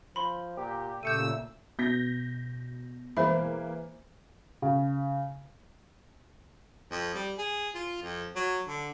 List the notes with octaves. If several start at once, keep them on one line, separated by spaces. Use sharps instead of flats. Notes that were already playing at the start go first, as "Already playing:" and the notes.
F3 B5 C6
A#2 G4
A#2 C#3 A3 E6 G6 C#7 D#7
B2 G6 A#6 B6
E3 G#3 A#3 C5 E5 B5
C#3
F2
G3
G#4
F4
F2
F#3
D3